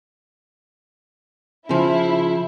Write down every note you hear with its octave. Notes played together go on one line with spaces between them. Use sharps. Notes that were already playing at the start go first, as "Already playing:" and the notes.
C#3 F3 E4